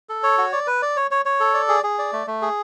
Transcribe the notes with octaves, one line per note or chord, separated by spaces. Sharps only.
A4
C#5
F#4
D5
B4
D5
C#5
C#5
C#5
A4
D5
G#4
G#4
D5
A3
A3
G#4